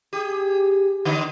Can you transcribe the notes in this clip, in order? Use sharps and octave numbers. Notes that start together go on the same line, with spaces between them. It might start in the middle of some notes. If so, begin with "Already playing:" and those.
G4 G#4
D3 B3 D#4